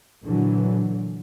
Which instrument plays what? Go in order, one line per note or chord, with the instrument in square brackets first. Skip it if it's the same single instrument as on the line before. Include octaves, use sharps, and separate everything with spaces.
[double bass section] A#2 D3 E3 F#3